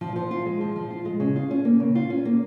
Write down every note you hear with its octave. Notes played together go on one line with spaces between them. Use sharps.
F3
F3
F4
G#3
F3
F3
F4
G#3
C#3
F4
C#4
A#3
C#3
F4
C#4
A#3